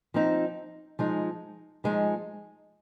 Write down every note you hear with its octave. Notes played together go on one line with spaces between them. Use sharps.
F3 C4 D#4
F3 G#3 D#4
F3 G#3 D#4